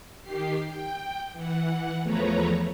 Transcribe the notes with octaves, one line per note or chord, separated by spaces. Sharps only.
D#3 G4 C7
G5
E3 F#5
E2 F3 A3 B4 C#5 A#5